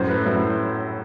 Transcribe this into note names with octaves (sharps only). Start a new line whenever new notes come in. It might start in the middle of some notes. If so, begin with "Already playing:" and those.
Already playing: F#2 A2 C5
B4
F#2 E4